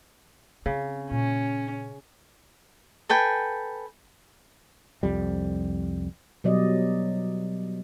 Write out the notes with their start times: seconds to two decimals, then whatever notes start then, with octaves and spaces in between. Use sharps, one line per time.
0.66 C#3 C4
1.11 A#2 C#4
3.10 A4 B4 G5 G#5
5.03 C2 F2 G3
6.44 B2 F#3 G3 D5 D#5